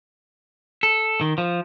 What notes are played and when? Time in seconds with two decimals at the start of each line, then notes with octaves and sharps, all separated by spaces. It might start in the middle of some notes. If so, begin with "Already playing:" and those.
0.83 A4
1.21 D#3
1.38 F3